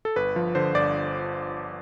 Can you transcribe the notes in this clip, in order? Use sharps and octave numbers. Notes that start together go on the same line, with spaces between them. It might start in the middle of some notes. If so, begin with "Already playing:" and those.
A4
G1 B4
F3
D3 C5
G1 D5